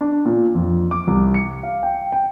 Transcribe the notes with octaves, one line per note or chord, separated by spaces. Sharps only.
D4
A#2
F2
D6
C2
C#7
F5
G5
G5